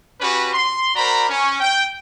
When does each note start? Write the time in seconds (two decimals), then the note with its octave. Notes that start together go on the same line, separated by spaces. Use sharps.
0.21 C#4 F#4 G4 B4
0.53 C6
0.95 F#4 A#4 C5 D5 A#5 B5
1.30 C#4
1.61 G5